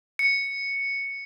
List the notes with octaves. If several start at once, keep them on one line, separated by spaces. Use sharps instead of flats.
C#7